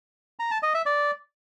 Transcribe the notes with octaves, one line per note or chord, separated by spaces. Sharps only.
A#5
A5
D#5
E5
D5